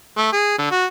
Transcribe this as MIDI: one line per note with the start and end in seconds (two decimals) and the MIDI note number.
0.17 0.29 57
0.32 0.56 68
0.58 0.70 50
0.71 0.86 66